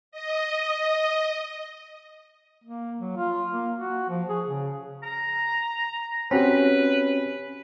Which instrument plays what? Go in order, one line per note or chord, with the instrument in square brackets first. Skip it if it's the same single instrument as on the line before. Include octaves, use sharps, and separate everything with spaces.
[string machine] D#5
[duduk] A#3
F#3
F4
A#3
F#4
F3
G#4
C#3
[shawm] A#5
[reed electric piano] C4 F#4 G4 [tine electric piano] C#4 [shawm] B4